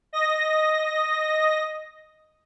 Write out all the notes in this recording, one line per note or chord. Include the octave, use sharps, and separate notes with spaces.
D#5 A#6